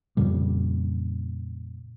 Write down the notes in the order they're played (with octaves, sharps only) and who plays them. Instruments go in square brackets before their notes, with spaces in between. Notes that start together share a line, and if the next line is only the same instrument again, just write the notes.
[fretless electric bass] F2 A#2 C#3 G3